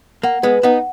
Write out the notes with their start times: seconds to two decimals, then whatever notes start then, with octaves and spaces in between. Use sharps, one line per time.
0.23 A#3 F#5
0.43 G#3 B3 B4
0.63 B3 D#4 F#5